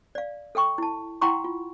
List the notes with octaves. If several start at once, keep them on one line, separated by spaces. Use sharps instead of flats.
D5 F5
A4 E5 G5 C#6
E4 A5
E4 F#5 G5 A#5 C6 C#6
F4